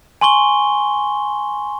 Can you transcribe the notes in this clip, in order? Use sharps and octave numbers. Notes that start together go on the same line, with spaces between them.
G#5 C6 C#6 G7